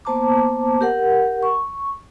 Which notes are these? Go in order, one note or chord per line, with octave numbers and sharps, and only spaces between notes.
A#3 B3 C5 A5 A#5 D6
G4 A#4 F#5
C#6